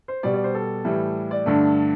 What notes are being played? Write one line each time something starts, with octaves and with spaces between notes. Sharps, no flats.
C5
B2 G3 D5
D5
C5
A4
A2 E3 G3
D5
G2 D3 A3